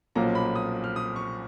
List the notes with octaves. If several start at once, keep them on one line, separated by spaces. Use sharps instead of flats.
B1 A#2 F3 A#3 C#4 A#5
B5
D#6
F6
D#6
C#6